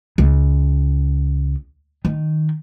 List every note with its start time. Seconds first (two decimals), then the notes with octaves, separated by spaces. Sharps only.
0.18 C#2
2.05 D#3